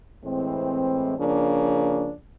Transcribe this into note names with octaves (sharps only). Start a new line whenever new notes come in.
A2 E3 G#3 C4
C#3 F3 A#3 D4